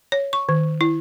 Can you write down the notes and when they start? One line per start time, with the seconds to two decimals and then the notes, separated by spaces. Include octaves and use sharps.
0.12 C#5
0.33 C#6
0.49 D#3
0.81 E4